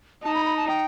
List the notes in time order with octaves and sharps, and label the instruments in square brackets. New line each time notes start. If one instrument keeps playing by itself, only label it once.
[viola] D#4 [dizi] A5
[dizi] B5
B5
A5
G5